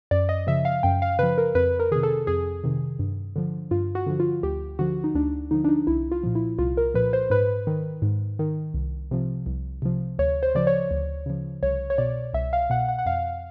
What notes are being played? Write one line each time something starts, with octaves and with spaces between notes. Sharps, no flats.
F#2 D5
D#5
C#3 F3 E5
F5
F#2 G5
F5
C#3 F3 B4
A#4
F2 B4
A#4
C3 D#3 G#4
A4
F2 G#4
C3 D#3
G2
D3 F3
G2 F4
F#4
D3 F3
F4
D2 G4
D3 F3 F#4
D#4
D2 D4
D3 F3 D#4
D4
D#4
C2 E4
F4
A#2 F3
E4
C2 F4
A#4
A#2 F3 B4
C5
G#2 B4
D#3
G#2
D#3
C2
C3 F3
C2
C3 F3
D2 C#5
C5
C#3 F3 D5
C#5
D2
C#3 F3
C2 C#5
C#5
B2 D5
C2 E5
F5
B2 F#5
F#5
F#5
F2 F5